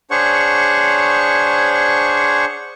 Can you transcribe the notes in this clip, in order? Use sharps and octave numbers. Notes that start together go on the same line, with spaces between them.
D4 G#4 C5 C#5 F#5 C#6